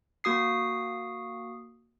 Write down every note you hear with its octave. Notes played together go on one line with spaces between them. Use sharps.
A#3 F#4 D#6 C7